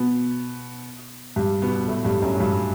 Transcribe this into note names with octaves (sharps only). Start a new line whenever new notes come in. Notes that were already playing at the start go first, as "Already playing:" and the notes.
Already playing: B2 B3
G2 G3
B2 B3
A2 A3
G2 G3
F#2 F#3
G2 G3